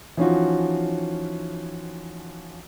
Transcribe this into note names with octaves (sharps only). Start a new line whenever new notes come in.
E3 F3 C#4 D#4 F4 F#4